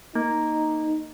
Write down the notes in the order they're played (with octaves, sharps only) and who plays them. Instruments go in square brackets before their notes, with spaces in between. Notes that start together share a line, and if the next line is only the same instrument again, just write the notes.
[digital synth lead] A#3 [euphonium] D#4